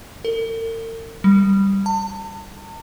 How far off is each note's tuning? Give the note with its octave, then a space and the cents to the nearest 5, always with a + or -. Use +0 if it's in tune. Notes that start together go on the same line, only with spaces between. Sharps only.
A#4 -45
G3 +0
A5 +40